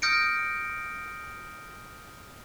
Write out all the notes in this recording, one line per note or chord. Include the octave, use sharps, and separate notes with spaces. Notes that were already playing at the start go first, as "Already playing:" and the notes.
D#6 F6 G6 A#6 C#7 D7